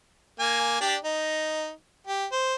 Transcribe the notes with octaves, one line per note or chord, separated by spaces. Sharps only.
A#3 G#5
D4 G4 D5
D#4
G4
C5